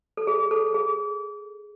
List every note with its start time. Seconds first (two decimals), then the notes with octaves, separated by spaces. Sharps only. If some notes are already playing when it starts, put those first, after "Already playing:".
0.17 A4
0.27 G#4
0.51 A4
0.74 G#4